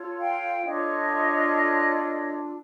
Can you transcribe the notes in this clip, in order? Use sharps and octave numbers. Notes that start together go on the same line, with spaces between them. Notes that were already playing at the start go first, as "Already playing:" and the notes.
Already playing: F4 A4 C#5
F5 G5
D4 F4 A4 C#5 D#5